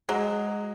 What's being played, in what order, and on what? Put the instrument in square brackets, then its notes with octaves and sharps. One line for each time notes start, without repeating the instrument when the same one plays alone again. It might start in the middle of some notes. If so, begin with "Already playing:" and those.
[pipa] F#3 [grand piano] G#3